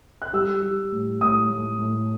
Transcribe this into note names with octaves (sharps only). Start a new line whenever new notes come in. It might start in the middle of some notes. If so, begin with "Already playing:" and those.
F#6
G3 E6
G3
A2
A2 D#6
A2
A2